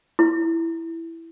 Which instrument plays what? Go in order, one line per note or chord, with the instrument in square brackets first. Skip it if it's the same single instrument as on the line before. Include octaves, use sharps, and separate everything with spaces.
[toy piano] E4